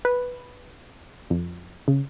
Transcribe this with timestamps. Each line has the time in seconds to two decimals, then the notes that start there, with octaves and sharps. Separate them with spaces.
0.05 B4
1.30 F2
1.88 C#3